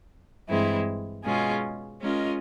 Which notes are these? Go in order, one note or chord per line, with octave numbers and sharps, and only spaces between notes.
G2 E3 G#3 C4 E4
B2 G#3 C#4 F4 G#4
G#3 C#4 F4 A#4 D#5